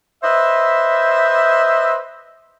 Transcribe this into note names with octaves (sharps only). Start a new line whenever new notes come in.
B4 C5 D#5 E5